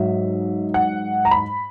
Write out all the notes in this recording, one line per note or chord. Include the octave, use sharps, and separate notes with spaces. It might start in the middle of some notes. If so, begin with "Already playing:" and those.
Already playing: G#2 F#3 E5
F#5
A#5
B5